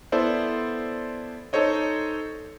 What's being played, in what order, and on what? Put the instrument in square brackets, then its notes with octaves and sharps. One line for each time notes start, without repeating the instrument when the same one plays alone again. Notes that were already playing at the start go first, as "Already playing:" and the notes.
[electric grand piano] B3 E4 A4 C5 D5
D#4 A4 C5 C#5 D#5